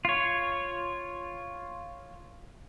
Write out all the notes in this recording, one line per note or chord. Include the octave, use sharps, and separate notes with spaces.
F4 C#5